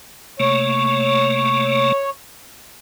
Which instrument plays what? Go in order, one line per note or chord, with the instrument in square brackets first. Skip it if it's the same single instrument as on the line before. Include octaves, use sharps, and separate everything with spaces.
[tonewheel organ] C3 A3 A#3 [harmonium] C#5